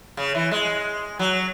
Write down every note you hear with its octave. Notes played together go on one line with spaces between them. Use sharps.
C#3
E3
G#3
F#3